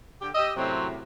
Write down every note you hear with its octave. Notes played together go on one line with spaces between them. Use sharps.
D3 G4
G4 D#5 E6
F#2 A2 C3 F#3 C4